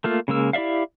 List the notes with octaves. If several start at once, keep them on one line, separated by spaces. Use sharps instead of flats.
A3 A#3 F4
C#3 G#3 A#3 E6
E4 G4 D5 E5 F5